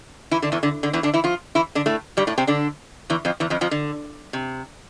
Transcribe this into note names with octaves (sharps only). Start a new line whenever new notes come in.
E3 E4
D3 D4
E2 E3
D3
D3
E2 E3
D3 D4
E3 E4
F3 F4
E3 E4
D3 D4
A2 A3
G2 G3
A2 A3
C3 C4
D3 D4
E2 E3
F2 F3
E2 E3
F2 F3
F2 F3
D3
C3